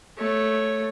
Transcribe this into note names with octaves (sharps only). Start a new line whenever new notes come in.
A3 C#5